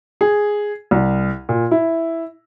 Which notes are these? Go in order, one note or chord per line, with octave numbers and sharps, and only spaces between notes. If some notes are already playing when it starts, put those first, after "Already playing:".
G#4
C2
A#2
E4